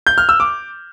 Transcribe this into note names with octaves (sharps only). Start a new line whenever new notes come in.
G6
F6
E6
D6